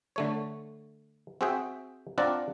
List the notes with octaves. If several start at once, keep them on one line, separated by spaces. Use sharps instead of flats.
D3 A3 C#5
C4 F#4 G#4 E5 G5
C4 D4 F4 D5 F#5 A#5